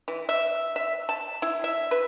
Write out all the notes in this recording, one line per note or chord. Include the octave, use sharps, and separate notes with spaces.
E3
E5
E5
A5
E4
E5
B4